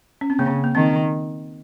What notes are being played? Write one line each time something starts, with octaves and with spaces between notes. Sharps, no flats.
C#4
C4
C#3 A#3
A#3
D#3 C4